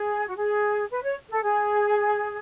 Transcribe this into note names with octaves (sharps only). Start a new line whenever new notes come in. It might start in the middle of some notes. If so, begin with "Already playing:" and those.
Already playing: G#4
F#4
G#4
B4
C#5
A4
G#4